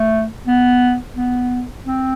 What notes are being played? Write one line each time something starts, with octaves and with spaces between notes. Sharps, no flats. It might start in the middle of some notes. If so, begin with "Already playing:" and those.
Already playing: A3
B3
B3
C4